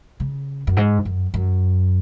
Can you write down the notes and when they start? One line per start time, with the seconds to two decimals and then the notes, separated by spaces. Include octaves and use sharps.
0.20 C#3
0.67 F#2
0.77 G#2
1.05 F#2
1.34 F#2